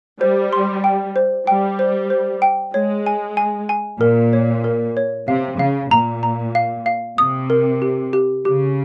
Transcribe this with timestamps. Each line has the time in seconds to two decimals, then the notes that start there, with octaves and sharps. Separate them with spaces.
0.20 G3 C5
0.53 C6
0.84 G5
1.16 C5
1.47 G3 G5
1.79 C5
2.10 C5
2.42 G5
2.74 G#3 C#5
3.06 G#5
3.37 G#5
3.69 G#5
4.00 A#2 A#4
4.33 C#5
4.64 A#4
4.97 C#5
5.28 C3 F5
5.59 C#3 F5
5.91 A#2 A#5
6.23 A#5
6.55 F5
6.86 F5
7.18 C3 D#6
7.50 A#4
7.82 G4
8.13 G4
8.45 C#3 G4